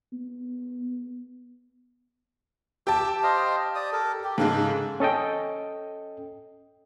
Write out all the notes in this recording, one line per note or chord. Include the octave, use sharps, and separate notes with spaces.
B3
G4 A5 D6 E6
C5 D#5 F5
D5 D#6
A4 A#4
G4
G#2 C#3 G#3 A4
C#4 A4 D#5 G5